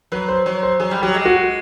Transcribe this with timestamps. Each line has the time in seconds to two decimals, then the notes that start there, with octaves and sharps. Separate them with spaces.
0.12 F#3 B4
0.28 C5
0.46 F#3 C#5
0.63 C5
0.80 F#3 G#4
0.91 G3
1.02 F#3 G4
1.14 G#3
1.25 F#4